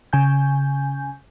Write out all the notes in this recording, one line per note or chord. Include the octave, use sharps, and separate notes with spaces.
C#3 G#5 G6